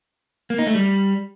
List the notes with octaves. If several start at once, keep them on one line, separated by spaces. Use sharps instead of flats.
A#3
D#4
A3
G3